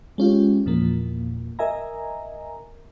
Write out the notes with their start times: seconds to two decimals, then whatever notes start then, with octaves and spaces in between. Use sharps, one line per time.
0.18 G#3 C#4 F4 G4
0.66 E2 A#2 F3 A#3
1.59 A#4 D#5 E5 G#5 A#5